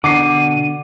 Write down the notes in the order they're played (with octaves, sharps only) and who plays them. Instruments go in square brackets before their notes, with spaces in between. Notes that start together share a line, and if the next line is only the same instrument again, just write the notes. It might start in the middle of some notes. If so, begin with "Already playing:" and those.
[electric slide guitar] B2 F#5 [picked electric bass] D3 [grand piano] D6 C7 [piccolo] D#7